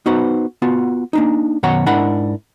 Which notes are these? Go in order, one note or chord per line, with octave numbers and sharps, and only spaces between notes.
B3 D#4 F#4 B4 C5
B3 F4 F#4
A#3 D4 D#4
F#2 B2 D#3 C#5 F#5 A#5
G#2 D4 E4 A#4 F#5 B5